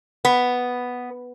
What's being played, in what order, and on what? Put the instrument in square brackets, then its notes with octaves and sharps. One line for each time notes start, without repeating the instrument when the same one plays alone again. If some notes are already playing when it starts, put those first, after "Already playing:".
[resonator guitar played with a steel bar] B3